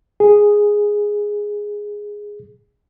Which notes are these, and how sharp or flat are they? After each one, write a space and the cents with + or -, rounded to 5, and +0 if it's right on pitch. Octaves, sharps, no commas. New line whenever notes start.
G#4 -5